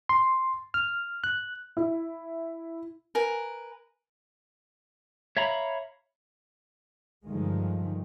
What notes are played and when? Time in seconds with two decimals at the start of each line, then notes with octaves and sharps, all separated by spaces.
0.09 C6
0.74 F6
1.24 F#6
1.77 E4
3.15 A#4 B4 G#5
5.37 C#5 E5 F5 A#5 B5
7.25 G2 D3 D#3 F3 G#3